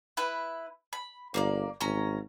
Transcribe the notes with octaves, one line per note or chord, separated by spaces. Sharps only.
E4 B4
B5
G1 A#3 C5 D5
G#1 C#4 A#5